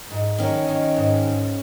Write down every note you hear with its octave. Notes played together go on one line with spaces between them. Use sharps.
G#2
D#3 C#4
D#3
G#2
G#2